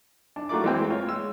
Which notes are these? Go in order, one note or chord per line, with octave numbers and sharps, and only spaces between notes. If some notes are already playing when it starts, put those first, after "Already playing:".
D4
F#3 A3 F4 A#4 D5 D6
E3 G#3 C4 G5
F4 C#5
G#3 E6